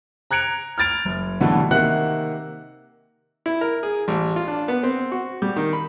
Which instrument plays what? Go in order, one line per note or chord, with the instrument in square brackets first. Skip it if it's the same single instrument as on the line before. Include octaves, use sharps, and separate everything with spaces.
[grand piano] A#5 F#6 G#6 C#7 D7 F7
F6 G#6 A6 D7 F7
F#1
B1 B2 D3 E3 G3 A3
C3 D#3 A#3 E5 F#5 F#6
[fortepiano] E4
A#4
G#4
A1
F4
D4
B3
C4
F#4
G3
D#3
B5